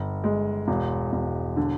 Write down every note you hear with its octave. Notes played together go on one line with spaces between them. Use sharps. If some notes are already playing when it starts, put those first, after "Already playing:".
Already playing: G1
G#3
E1
E1
D3